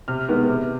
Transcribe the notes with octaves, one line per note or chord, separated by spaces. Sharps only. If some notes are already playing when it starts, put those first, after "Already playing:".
C3 F6
D#3 G#3 B3
C3